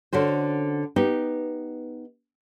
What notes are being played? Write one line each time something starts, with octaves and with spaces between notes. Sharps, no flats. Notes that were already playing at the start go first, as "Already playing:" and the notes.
D3 C#4 F#4 C5
B3 D#4 G4